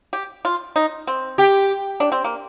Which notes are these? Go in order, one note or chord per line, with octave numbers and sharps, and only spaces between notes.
G4
F4
D#4
C4
G4
D4
C4
A#3